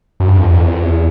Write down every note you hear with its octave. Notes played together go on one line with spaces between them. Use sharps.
F#2
G2
F2
E2
F2
E2
F2
E2